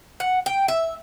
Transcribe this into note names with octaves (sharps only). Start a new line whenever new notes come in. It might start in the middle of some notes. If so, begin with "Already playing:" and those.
F#5
G5
E5